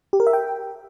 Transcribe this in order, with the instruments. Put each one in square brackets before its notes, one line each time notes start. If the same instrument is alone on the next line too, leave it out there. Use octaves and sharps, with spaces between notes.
[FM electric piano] G4
A#4
E5
G5